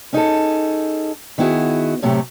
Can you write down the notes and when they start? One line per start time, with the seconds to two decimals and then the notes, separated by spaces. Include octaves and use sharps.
0.13 C#4 D#4 G#4 A4
1.38 D#3 B3 E4 F#4 G#4
2.02 A2 C3 F#3 G#3 A3 G4